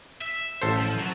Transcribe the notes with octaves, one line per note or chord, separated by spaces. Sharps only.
E5
A1 A4 C5
F3
F#3